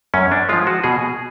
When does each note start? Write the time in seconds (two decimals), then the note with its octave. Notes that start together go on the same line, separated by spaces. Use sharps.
0.14 F#2 C#4
0.32 D4
0.49 F3 G#3 F4
0.67 F#4
0.84 B2 G#4